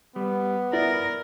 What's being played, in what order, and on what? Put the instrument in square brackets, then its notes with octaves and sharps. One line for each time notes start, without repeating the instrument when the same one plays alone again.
[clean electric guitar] G3 [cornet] B3
[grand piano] E4 [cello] A#4 [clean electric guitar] D5